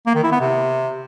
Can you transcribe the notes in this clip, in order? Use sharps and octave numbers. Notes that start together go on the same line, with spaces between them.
A#3
D#3
E4
B3
C3